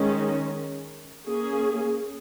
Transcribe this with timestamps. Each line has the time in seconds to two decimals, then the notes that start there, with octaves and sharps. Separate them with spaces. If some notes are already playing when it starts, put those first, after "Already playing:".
Already playing: D#3 G#3 C#4
1.27 A#3 C#4 G#4